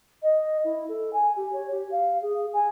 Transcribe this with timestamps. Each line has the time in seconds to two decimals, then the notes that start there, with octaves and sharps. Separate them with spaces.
0.22 D#5
0.64 E4
0.88 A4
1.13 G#5
1.36 G4
1.52 C#5
1.71 G4
1.91 F5
2.21 G#4
2.53 G#5